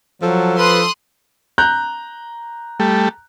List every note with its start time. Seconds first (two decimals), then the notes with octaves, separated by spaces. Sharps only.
0.22 F3 F#3 A4
0.58 B4 C6 D#6 F#6
1.58 A#5 F#6 G6
2.80 G3 A3